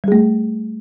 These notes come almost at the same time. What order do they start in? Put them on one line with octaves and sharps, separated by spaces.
G3 G#4 A3